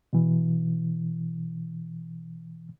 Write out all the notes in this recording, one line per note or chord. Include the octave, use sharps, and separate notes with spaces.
B2 E3